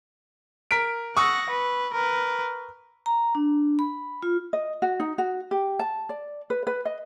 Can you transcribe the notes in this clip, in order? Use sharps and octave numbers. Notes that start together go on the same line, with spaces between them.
A#4 B6 D7
F#5 C#6 D#6 E6 A#6
B4
A#4 B4
A#5
D4
B5
F4
D#5
F#4
D#4
F#4
G4
A5
D5
B4
B4
D#5